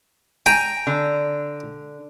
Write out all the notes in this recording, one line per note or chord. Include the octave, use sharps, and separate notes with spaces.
G5 G#5 A#5
D3